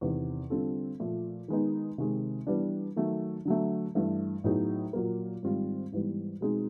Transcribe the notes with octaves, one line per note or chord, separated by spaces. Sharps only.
E2 C3 D#3
D3 G3 C4 F4 A4
A#2 F3 A3
D#3 G#3 B3 D#4
C3 D#3 G#3
E3 G3 B3 D4
D#3 F#3 A3
D3 F#3 A3
G2 E3 A3
A2 F#3 B3 D#4 G#4
A#2 F#3 A#3
G#2 D#3 G3 C4 F4
G#2 E3 G3 B3
B2 G#3 C4 D#4 G#4